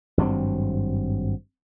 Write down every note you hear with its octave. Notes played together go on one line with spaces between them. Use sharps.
G#1 G2 F#3 C4